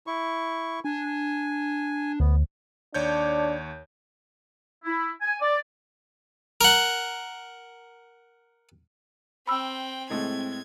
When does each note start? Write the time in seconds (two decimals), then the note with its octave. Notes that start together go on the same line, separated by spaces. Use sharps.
0.07 E4 C#6
0.85 D4 G#5
2.20 D2 B3
2.94 D#2 D4 C#5 G6
4.84 E4
5.21 G#5
5.41 D5
6.61 A#4 F#5
9.47 C4 G5 B5 E6
10.10 A2 G#3 A3 C4 G#6